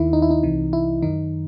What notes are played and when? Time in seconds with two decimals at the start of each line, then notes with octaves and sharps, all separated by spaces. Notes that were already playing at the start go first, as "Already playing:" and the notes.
Already playing: D#2 D#3 E4
0.13 D#4
0.22 E4
0.31 D#4
0.43 C2 C3 E3
0.73 E4
1.02 F#2 D#3 D#4